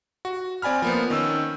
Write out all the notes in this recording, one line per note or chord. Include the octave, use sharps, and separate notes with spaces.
F#4
C4 D5 G#5 B5 F6
F3 A#3 B3
D#3 C#4 E6